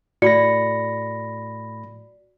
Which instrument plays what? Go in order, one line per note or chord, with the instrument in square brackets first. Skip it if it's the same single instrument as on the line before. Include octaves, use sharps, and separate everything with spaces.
[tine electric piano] A2 B5 A#6 [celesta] F#4 D5 C#7